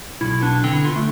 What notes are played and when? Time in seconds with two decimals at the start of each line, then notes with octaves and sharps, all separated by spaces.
0.21 B1 E4
0.33 E4
0.42 B3 D4
0.64 D3 C4
0.73 E4
0.84 D3 F4
0.96 A3